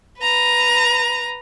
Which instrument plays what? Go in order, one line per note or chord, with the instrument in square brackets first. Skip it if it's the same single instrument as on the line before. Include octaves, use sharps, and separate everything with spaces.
[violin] B4 A#5